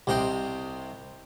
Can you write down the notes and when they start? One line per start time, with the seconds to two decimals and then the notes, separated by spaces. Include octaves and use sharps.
0.07 C2 C3 D#5 G5 C6